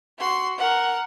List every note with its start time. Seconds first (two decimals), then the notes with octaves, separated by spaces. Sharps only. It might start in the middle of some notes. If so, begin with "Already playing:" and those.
0.19 F#4 C6
0.58 A#4 F#5